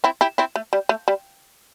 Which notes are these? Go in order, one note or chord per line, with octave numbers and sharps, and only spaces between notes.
C4 E4
E4 G4
C4 E4
A3
G3
A3
G3